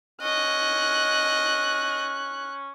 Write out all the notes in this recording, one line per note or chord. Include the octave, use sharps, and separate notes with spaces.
C#4 D#5 F#6